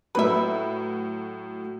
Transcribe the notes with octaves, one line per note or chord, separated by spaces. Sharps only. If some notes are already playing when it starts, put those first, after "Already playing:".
A2 F#3 B4 E5